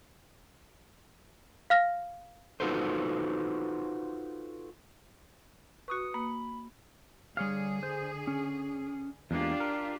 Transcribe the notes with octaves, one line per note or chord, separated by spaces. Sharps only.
F5 F6 A#6
D#4 F4 F#4 A4 B4 C5
F#4 B4 C#6 D#6 C#7
A#3 B5
D3 G3 G#4 C#5 F5
C5
C#4
E2 G#3 A#3 D4 F4 G4
A#4